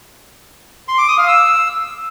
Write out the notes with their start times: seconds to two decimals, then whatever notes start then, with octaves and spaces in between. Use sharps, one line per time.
0.88 C6
0.98 D6
1.08 D#6
1.18 F5
1.28 E6